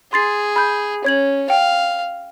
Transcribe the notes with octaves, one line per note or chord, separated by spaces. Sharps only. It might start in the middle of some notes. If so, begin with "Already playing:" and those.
G#4 C6 A6 C7
B5 G6
C#4 C#5 G#6 F#7
F5 G5